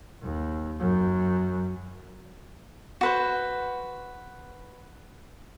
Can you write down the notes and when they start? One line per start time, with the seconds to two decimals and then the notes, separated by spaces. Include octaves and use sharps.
0.22 D#2
0.79 F#2
3.01 F#4 B4 C5